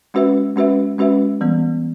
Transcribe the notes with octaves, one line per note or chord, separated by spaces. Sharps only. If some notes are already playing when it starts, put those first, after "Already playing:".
G#3 C#4 F#4 B4 E5
G#3 C#4 F#4 B4 E5
G#3 C#4 F#4 B4 E5
E3 G3 B3